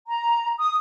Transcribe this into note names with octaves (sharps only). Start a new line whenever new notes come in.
A#5
D#6